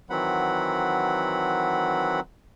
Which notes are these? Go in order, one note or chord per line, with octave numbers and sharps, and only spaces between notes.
D#3 E3 F#3 C4 F#5 B5